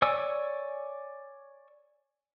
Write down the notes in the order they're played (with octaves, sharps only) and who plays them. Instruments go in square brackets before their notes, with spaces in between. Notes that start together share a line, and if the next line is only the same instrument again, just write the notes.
[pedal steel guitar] C#5 D5 G#5 E6